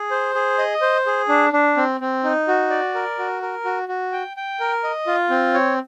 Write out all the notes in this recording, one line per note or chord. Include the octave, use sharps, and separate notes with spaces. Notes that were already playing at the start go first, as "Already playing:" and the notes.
Already playing: G#4
C5
G#4
D#5
C5
G#4
D4
D4
C4
C4
D#4
F#4
D5
A#4
F#4
A#4
F#4
F#4
G5
G5
A#4
D#5
F4
C4
C#5